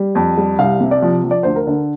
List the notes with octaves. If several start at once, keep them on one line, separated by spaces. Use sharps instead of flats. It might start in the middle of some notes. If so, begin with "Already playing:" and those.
Already playing: G3
F2
G3
C2 F5
C3
D5
F3
F3
D5
D2 C5
A#4
D3